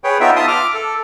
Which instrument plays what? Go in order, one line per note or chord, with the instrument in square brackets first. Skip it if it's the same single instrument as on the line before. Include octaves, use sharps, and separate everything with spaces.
[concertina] G#4 B4 C#5 G5
B3 D#4 F4 E5 G5
F4 E5 A5 C6 D#6
D6 F6
A4